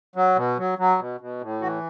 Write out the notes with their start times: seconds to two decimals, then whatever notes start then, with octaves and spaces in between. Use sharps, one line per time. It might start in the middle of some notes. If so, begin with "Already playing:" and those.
0.16 F#3
0.36 B2
0.58 F#3
0.78 F#3
0.99 B2
1.21 B2
1.41 A2
1.61 E3 F#4